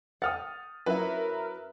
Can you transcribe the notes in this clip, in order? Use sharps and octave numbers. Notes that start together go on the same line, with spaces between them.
F#5 G5 D#6 F6 A6
F#3 C#4 E4 A#4 B4 E5